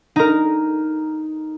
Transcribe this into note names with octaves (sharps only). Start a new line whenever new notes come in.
D#4 A#4